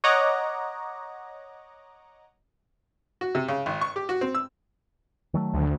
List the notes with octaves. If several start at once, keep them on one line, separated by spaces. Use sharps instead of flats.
C#5 D#5 F#5 A#5 D6
F#4
C3
C#3
G#1
C#6
G4
F#4
C4
E6
D#3 F#3 A3
D2